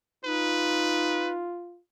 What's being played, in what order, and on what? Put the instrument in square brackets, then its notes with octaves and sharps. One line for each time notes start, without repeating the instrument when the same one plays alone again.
[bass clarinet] D#4 [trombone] F4 [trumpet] B4